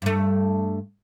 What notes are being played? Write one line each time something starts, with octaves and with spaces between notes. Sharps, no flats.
G2 A3